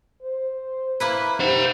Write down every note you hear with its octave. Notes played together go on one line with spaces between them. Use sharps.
C5
A#3 E4 B4
G4 C5 F#5